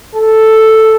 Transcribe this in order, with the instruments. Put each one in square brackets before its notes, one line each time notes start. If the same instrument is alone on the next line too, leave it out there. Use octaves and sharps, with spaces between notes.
[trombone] A4